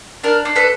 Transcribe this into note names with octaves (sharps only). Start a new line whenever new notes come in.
D4 A#4
D4
A4 B4